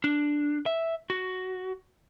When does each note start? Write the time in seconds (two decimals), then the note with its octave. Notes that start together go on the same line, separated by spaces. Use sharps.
0.04 D4
0.66 E5
1.10 F#4